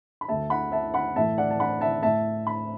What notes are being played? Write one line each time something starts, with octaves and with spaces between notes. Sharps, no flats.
B5
D2 D3 A3 E5 A5
F#5 B5
E5 A5
F#5 B5
A2 E3 A3 E5 A5
D5 F#5
A5
F#5 B5
E5 A5
A2 A3 E5 A5
B5